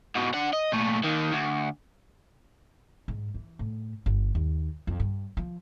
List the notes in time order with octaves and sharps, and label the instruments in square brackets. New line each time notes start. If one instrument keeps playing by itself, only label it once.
[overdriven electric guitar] G#2 B2
D4 F#5
D#5
A#2 A3
D#2 D#3
D2
[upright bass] G#2
E3
A2
G1
D#2
F2
G2
F3